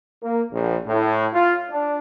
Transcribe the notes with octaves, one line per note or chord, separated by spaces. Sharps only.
A#3
A#1
A2
F4
D4